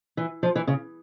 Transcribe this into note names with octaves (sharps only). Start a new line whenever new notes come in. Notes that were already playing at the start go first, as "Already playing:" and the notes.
E3
F3
E3
C#3